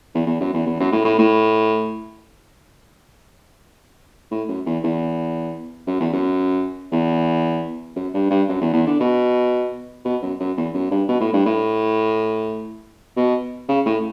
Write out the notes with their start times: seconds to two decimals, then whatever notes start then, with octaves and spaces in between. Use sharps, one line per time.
0.14 E2
0.27 E2
0.40 F#2
0.53 E2
0.66 E2
0.80 F#2
0.92 A2
1.05 A2
1.19 A2
4.31 A2
4.48 F#2
4.66 E2
4.83 E2
5.87 F#2
6.00 E2
6.13 F#2
6.92 E2
7.96 F#2
8.14 G2
8.30 G2
8.49 F#2
8.61 E2
8.73 E2
8.86 D3
9.00 B2
10.05 B2
10.22 F#2
10.40 F#2
10.57 E2
10.74 F#2
10.91 G2
11.08 B2
11.21 A2
11.33 G2
11.45 A2
13.17 B2
13.68 C#3
13.86 A2